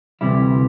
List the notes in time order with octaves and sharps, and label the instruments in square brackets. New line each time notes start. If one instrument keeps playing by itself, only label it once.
[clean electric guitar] D2 C3 E3 G3 E4